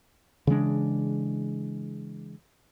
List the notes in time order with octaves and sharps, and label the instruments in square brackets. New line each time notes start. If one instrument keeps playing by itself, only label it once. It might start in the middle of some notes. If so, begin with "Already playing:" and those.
[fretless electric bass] C#3 E3 G#3 D4